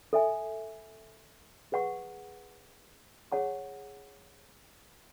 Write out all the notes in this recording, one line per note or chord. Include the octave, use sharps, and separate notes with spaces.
A4 E5 G#5
G#4 B4 F#5 C#6
G#4 C#5 F#5 A5 C#6